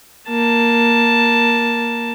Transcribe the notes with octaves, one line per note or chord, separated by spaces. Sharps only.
A#3 A5